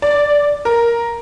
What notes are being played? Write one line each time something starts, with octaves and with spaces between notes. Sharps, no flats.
D5
A#4